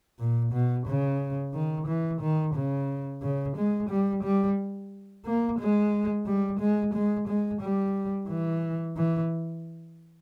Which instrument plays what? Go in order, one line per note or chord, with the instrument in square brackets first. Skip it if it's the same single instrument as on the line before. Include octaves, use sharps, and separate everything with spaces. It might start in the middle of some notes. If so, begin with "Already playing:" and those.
[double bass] A#2
B2
C#3
D#3
E3
D#3
C#3
C#3
G#3
G3
G3
A#3
G#3
G3
G#3
G#3
G#3
G3
E3
E3